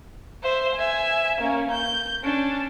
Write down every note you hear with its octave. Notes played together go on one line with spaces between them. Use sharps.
C5 E5
E5 G#5
A#3 C#4
G6
C#4 D4